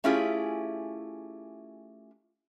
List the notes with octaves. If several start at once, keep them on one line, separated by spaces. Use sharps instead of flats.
A3 C#4 E4 F4 G4 G#4